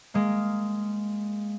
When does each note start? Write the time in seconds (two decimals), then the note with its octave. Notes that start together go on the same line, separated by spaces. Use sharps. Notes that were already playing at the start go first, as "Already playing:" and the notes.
0.14 G#3 A#3